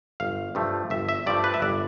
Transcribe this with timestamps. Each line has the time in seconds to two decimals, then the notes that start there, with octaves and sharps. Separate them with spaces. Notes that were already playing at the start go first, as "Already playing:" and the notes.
0.20 G1 F5
0.55 G2 F3 A3
0.90 G1 E5
1.09 E5
1.26 G2 F3 A3 D5
1.44 B4
1.54 E5
1.62 G1 D5